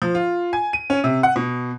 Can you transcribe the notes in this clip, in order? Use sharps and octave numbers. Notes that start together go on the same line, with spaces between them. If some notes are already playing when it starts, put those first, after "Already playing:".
F3
F4
G#5
D#7
C#4
C3
F#5
B2